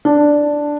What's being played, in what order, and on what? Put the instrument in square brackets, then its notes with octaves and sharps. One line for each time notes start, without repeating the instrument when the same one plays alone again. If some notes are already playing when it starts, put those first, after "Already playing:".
[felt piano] D4